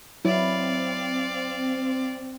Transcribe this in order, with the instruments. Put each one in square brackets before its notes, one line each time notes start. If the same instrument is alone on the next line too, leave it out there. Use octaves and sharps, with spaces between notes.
[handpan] F#3 E4 [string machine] C4 [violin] D5 F5